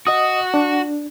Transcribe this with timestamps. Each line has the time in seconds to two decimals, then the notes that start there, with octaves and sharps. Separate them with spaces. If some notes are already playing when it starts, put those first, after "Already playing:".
0.07 F#4 D#5 D#6
0.54 D4